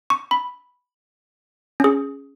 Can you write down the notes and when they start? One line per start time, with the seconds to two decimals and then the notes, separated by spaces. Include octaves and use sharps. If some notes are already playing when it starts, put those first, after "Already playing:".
0.10 C#6
0.31 B5
1.80 C#4 G#4